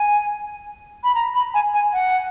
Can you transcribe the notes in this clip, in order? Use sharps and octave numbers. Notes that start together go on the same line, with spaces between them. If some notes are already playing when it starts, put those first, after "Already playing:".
Already playing: G#5
B5
A#5
B5
G#5
G#5
F#5